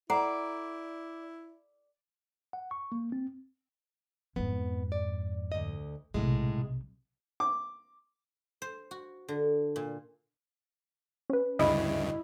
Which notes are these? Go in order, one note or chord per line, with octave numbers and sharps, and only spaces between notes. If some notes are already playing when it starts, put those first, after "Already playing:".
E4 A4 D5 F#5 A#5
F#5
C#6
A#3
C4
F2 G#2 B3
D5
D2 D#5
B1 A2 C3 G#3
D6
C5
F#4
D3
A#2
C#4 B4
D2 G2 C#3 E4 D#5